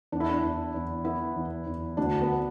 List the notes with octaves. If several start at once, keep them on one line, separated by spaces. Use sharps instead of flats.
E2 D4
E4
D4
E2
E2
B3 E4
E2
E2
D2 D4
B3
D4